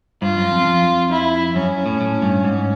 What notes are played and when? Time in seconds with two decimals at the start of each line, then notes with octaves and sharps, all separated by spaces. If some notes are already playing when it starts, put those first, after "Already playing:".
0.22 G2 F4
0.37 F#2
0.52 F2
0.67 F2
1.11 E4
1.56 F#2 C#4
1.86 A2
2.01 A2
2.22 G2
2.45 G#2